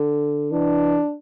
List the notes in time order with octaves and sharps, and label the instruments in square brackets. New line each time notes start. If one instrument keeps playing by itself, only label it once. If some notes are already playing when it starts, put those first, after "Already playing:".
Already playing: [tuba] D3
[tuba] E3 [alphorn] D4